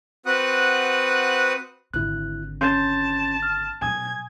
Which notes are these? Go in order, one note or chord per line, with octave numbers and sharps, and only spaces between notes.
C4 F#4 B4 F#5 D#6 F#6
G#1 D3 E4 F#6
C#4 A5 C6 G6
F6
B2 F#3 G#5 D#6 G#6